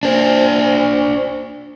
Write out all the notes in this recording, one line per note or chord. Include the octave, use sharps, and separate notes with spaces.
D4 C5